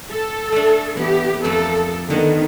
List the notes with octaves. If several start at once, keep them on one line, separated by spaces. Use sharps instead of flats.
A4
A3 D4
E3 B3 G4
F2 A3 A#3 A4
D3 D#3 B3 D#5 F#5